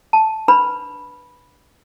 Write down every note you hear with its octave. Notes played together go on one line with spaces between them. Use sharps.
A5
D4 B4 B5